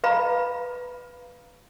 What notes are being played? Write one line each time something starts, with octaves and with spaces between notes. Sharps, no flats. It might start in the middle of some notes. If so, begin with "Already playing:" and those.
B4 F5 A#5 B5